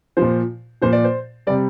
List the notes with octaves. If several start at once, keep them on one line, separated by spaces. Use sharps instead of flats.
A#2 F3 C5
A#2 F3 C5
D5
C5
C3 G3 D5